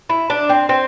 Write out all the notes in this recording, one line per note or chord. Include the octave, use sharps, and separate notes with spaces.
E4
D4
C4
C4